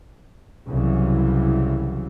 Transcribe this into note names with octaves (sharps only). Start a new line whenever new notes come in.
C2 C#3 E3 F#3